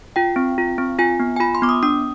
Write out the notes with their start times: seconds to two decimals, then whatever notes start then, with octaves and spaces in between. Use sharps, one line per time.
0.16 F4 G5
0.36 C4
0.58 F4
0.78 C4
0.99 F4 G#5
1.20 B3
1.36 G#5
1.40 F4 B5
1.55 C6
1.62 B3 D6
1.69 D#6
1.83 D4 D#6